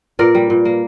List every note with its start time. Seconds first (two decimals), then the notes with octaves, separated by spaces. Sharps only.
0.19 A#2 A#4 D5
0.35 G3
0.50 A#2
0.65 A#3